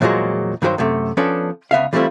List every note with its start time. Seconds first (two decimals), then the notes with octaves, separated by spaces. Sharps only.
0.01 E2 A#2 F3 F#3 G#3
0.62 G2 D#3 F#3 G#4 C5 G5
0.78 F#2 C3 A3
1.17 F3 B3 C#4 D4 A4 D5
1.71 C#2 B3 E5 F5
1.93 E3 G3 A3 C4 E4 F4